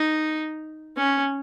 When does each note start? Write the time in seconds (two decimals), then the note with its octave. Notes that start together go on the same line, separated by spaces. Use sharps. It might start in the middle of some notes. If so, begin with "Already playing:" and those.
Already playing: D#4
0.97 C#4